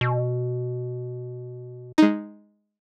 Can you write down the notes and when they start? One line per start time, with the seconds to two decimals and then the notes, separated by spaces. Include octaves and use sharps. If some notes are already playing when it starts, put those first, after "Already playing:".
0.01 B2
1.98 G#3 D#4